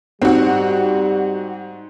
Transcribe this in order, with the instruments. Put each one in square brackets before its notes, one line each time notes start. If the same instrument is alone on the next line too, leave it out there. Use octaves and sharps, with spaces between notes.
[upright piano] G#2 [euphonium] G3 [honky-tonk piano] C4 F#4